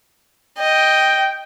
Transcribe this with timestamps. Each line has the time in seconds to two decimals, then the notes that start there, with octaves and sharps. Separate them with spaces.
0.59 D#5 G5